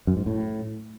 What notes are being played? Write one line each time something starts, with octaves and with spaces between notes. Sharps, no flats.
F#2
G#2
A2